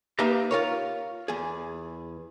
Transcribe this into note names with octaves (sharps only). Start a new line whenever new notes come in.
A#3 D#4 G4 B4 E5 A#5
F4 A#4 C#5
E2 G#4